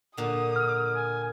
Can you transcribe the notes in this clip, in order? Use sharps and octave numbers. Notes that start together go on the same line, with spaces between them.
A#2 D3 D#6
F6
G#5